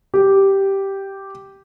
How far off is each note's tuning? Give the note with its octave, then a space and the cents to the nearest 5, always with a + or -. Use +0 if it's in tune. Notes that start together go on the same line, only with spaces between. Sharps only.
G4 -5